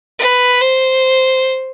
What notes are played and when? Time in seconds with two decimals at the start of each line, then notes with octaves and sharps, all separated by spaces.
0.19 B4
0.61 C5